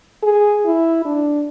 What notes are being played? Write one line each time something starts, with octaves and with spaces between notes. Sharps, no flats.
G#4
E4
D4